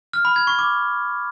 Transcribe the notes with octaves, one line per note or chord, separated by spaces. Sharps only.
F6
B5
G#6
C#6
D6